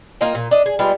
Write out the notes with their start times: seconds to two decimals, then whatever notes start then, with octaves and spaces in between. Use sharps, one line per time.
0.21 A#3 F4 D#5 G5
0.35 A#2
0.51 D4 D#5
0.66 G#4
0.79 G3 G#3 B3 F4